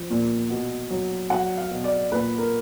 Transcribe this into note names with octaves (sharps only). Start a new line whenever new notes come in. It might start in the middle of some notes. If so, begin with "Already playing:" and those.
Already playing: F3
A#2
B2
F#3
F#3 F#5
F5
B2
D5
A#2 B4
A#4